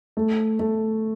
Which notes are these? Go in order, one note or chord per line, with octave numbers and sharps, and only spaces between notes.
A3
A3